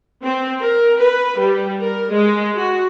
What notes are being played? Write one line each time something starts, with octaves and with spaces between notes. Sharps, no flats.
C4
A#4
B4
G3
A#4
G#3
F#4